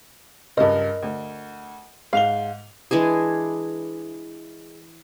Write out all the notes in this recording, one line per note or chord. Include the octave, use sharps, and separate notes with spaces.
C#2 G2 A#4 D#5
D2
G#2 F5 F7 G7
E3 G#3 D4 G#4